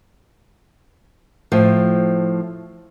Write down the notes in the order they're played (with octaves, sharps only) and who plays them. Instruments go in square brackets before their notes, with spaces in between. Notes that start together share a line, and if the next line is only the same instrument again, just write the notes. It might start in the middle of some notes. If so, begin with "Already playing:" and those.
[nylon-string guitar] A2 F3 C5